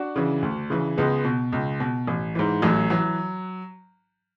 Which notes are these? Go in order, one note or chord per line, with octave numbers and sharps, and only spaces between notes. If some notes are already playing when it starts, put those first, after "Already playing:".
Already playing: D4 F#4
C#3 E3
D2
C#3 E3
C#2 G#3 B3
B2
C#2
B2
A1
G#2 E3
A1 F#3 A3
E3 F#3